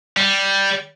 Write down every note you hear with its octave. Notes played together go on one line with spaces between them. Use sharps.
G3